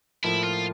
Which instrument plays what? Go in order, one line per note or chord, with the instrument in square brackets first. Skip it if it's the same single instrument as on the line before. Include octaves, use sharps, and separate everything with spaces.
[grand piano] A2 F3 A#3 [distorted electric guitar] E4
[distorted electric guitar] F4